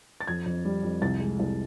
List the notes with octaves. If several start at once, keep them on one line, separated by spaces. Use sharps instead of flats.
A6
F2 G#6
F2
G3
F2
C2 A6
G#3
C2